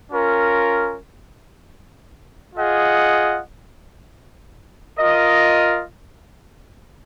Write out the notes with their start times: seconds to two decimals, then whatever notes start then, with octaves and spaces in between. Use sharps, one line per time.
0.12 C#4 F4 A#4
2.55 F4 G#4 D#5 F#5
4.98 F4 A#4 D#5